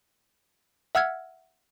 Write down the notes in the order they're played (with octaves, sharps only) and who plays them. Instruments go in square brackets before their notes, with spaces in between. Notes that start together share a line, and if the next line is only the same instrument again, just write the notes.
[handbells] E5 F#5 E6 F6 G#6